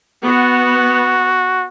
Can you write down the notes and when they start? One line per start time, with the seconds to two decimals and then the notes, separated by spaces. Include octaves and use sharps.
0.24 B3 F#4